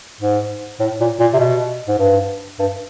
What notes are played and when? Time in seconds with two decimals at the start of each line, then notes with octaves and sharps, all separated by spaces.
0.20 G#2
0.80 A2
1.01 A#2
1.20 A#2
1.33 C3
1.39 B2
1.88 G#2
1.99 G2
2.59 G2